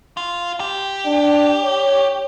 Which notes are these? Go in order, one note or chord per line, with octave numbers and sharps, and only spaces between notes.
F4
G4
D4
C#5